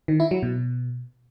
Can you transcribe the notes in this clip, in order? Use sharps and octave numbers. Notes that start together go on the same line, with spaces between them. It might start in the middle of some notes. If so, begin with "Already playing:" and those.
D#3
E4
F#3
B2